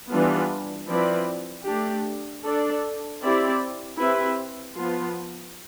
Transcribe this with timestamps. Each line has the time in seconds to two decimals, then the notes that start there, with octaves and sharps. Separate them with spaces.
0.11 E3 G3 B3 D4 F4
0.90 F3 C4 E4 B4 D5
1.67 A3 D4 G4
2.45 D4 A4 D5
3.23 C4 E4 G4 D5
4.00 C4 E4 G4 B4 E5
4.78 F3 B3 F4